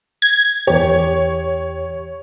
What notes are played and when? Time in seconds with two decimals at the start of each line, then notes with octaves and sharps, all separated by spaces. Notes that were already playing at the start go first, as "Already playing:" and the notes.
0.22 G#6
0.67 E2 G4 C#5